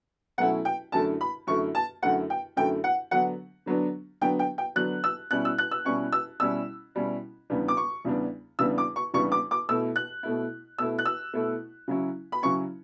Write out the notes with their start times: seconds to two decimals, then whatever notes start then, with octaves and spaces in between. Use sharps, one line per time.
0.38 B2 F#3 A3 C#4 E4 F#5
0.65 G5
0.92 F#2 D3 A3 E4 A5
1.21 B5
1.47 F#2 D3 A3 E4 C#6
1.75 A5
2.02 F#2 D3 A3 E4 F#5
2.30 G5
2.57 F#2 D3 A3 E4 G5
2.84 F#5
3.11 D3 F#3 B3 D4 F#5
3.66 D3 F#3 B3 D4
4.21 D3 F#3 B3 D4 G5
4.39 G5
4.58 G5
4.76 D3 F#3 B3 D4 F#6
5.04 E6
5.31 B2 G3 C#4 E4 F#6
5.45 E6
5.58 F#6
5.71 E6
5.85 B2 G3 C#4 E4 C#6
6.12 E6
6.40 B2 G3 C#4 E4 E6
6.95 B2 G3 C#4 E4
7.50 E2 C#3 G3 B3 D4
7.68 D6
7.77 C#6
8.05 E2 C#3 G3 B3 D4
8.59 E2 C#3 G3 B3 D4 E6
8.78 D6
8.96 C#6
9.14 E2 C#3 G3 B3 D4 C#6
9.32 D6
9.51 D6
9.69 B2 A3 E4 E6
9.96 F#6
10.23 B2 A3 E4
10.78 B2 A3 E4 E6
10.99 F#6
11.06 E6
11.33 B2 A3 E4
11.88 C#3 F#3 C#4 E4
12.32 B5
12.42 C#3 F#3 C#4 E4 C#6